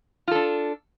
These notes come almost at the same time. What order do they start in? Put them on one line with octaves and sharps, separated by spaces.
F4 A4 D4